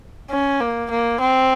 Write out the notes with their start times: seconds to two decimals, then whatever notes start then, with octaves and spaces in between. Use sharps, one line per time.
0.30 C#4
0.60 A#3
0.90 A#3
1.20 C4